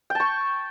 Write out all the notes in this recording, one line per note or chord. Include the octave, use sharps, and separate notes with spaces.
G5 A5 C#6